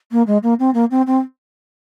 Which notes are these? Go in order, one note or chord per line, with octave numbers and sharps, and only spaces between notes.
A#3
G#3
A#3
C4
A#3
C4
C4